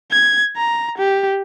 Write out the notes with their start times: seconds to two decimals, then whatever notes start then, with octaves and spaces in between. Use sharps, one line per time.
0.11 G#6
0.57 A#5
0.98 G4